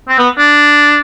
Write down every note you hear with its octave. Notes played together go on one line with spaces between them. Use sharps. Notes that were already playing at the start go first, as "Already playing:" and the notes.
C4
B3
D4